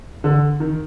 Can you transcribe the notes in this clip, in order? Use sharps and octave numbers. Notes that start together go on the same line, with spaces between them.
D3
D#3